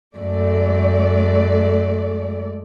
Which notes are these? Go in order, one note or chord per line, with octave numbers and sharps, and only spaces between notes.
F#2 G#3 A3 D5